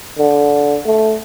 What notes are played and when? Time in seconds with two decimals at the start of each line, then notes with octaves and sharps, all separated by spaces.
0.18 D3
0.86 A3